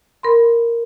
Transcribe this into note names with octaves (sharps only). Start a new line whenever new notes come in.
A#4 B5 C6